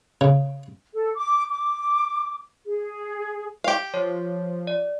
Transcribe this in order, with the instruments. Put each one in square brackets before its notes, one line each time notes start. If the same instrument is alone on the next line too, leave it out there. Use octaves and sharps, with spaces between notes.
[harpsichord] C#3
[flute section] A4
D6
D6
G#4
[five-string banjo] G4 F5
[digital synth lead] F3 [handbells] C#5
[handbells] D5